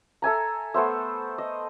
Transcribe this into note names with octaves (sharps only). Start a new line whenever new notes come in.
A4 E5 G#5 A#5
A3 B3 C5 E5
D#5